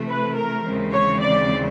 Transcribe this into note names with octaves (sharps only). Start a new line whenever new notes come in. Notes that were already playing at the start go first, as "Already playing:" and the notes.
Already playing: C3 E3 A3
B4
A#4
D#2 C#3 E3 G#3 C4
C#5
D5